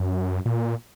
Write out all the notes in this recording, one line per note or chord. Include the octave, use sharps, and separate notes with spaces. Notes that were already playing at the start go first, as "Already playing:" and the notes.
Already playing: F#2
A#2